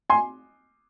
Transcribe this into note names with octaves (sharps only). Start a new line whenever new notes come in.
G#5 C6